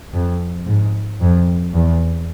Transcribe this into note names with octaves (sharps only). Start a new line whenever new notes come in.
F2
G#2
F2
E2